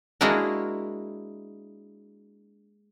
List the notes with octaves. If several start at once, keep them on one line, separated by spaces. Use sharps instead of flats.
G#3 A#3 D4 E4 F#4 A#4